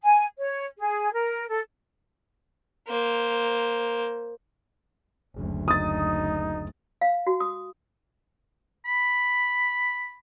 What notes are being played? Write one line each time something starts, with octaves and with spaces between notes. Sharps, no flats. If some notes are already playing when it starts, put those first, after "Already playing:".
G#5
C#5
G#4
A#4
A4
A#3 C5
F#1 D2
D#4 D#6 A6
F5
F#4
D#6
B5